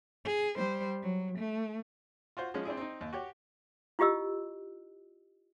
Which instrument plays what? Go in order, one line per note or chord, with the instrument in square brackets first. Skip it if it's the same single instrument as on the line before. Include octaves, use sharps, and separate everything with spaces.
[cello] G#4
G3 C5
F#3
A3
[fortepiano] F4 F#4 C5
F3 G#3 C#4
C4 D4 E4 G#4
C4 D#4
D#2
F#4 G4 C#5
[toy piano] E4 F4 G4 D#5 E6